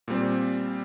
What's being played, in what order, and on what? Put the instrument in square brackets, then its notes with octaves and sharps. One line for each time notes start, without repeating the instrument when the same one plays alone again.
[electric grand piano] A#2 G3 C4